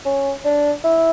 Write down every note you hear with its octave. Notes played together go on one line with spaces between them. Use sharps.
C#4
D4
E4